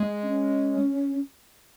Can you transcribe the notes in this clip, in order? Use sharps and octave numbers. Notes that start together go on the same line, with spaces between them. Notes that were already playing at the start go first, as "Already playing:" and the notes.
Already playing: G#3
C#4